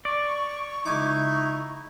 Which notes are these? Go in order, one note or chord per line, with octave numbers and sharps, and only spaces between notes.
D5 C#6
C#2 D#4 E4 G#5 D6